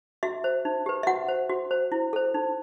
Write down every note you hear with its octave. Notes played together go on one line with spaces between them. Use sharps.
F#4 E5
C5
D#4
G4 B4
E5
F#4 F#5
C5
F#4
C5
E4
A4 C5
D#4